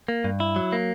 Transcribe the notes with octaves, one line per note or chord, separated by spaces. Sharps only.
A#3
G2
E4
F#3
A#3